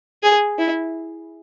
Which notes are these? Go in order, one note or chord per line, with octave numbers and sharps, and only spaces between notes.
G#4
E4